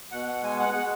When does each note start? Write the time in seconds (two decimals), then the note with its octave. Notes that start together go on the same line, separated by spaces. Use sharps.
0.12 B2 F#5
0.28 F#5
0.43 G#3 G#5
0.59 F#5
0.74 G#3 F#5